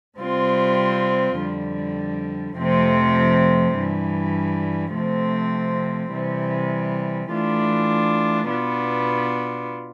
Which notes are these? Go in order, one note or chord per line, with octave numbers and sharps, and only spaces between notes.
C3 G3 C4 F4
F2 D3 G3
F2 C3 F3 A3 C4
G2 E3 G3
C3 F3 A3 C4
C3 E3 G3
E3 A3 D4 F4
B2 B3 D4 F4